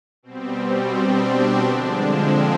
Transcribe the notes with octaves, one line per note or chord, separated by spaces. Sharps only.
B2 G3 C4
C4
D4
D3 F3 G#3 D4
C4